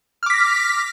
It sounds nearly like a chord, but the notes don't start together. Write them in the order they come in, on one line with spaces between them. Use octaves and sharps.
F6 D6 B6 A#6